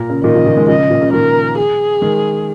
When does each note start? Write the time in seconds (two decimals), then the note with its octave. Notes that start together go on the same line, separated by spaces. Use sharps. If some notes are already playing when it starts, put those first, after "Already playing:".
Already playing: A#2 A#4
0.10 C#3
0.24 A#2 D#3 D#5
0.35 C#3 F3
0.46 A#2 D#3
0.57 D#3 G#3
0.68 C#3 F3 D#5
0.79 C#3
0.90 A#2
1.02 C#3
1.13 A#2 D#3 A#4
1.58 G#4
2.01 D#3 G#3